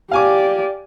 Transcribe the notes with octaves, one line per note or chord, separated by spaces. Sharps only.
G4 D5 F5 G#5 D6